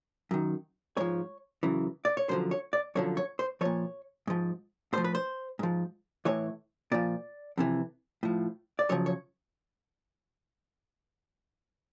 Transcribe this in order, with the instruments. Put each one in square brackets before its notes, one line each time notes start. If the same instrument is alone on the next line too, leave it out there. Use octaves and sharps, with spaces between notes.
[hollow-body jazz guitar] F#2 D#3
G#2 F3 C#5
F#2 C#3 E3
D5
C#5
F#2 D3 F3 C5
C#5
D5
F#2 D3 F3 C#5
C#5
C5
A#2 F3 C#5
G#2 F3
A2 F3 C5
B4
C5
G#2 F3
A2 E3 C#5
A#2 F3 D5
F2 C3 E3
A2 F3
D5
F#2 C#3 F3 C#5
C#5